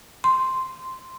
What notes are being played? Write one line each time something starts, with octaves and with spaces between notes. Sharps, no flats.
C6